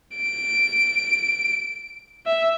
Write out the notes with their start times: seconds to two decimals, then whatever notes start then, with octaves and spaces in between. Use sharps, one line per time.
0.17 D7
2.26 E5